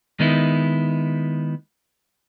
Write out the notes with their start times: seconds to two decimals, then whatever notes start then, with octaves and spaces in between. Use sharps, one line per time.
0.19 D#3 G#3 B3 D#4 E4